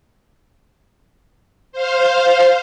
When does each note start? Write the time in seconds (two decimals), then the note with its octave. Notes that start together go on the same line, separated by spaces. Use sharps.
1.72 C5 F5